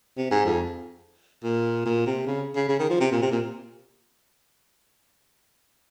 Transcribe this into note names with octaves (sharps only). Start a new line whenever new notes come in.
C3
G#2
F2
A#2
A#2
C3
C#3
C#3
C#3
D#3
F3
C3
A#2
C3
A#2